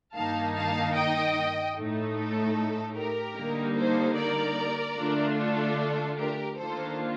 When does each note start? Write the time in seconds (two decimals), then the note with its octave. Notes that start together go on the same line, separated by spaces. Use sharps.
0.14 G2 D#3 A#3 D#4 F5 A5
0.55 F5 A5
0.95 D#5 G5
1.75 A2 A3 D#4
2.15 A4
2.96 G4 A#4
3.36 D3 G3 A#3 D#4
3.76 A4 C5
4.17 A#4 D5
4.97 D3 A3 D4 F4
5.38 A4
6.18 G4 A#4
6.58 D#3 A#3 D4 F4 A4 C5